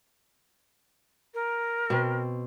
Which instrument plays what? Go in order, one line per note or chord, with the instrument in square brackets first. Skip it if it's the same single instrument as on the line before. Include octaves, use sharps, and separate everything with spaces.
[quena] A#4
[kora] B2 C4